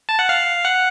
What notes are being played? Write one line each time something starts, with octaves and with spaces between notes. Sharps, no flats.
A5
F#5
F5
F#5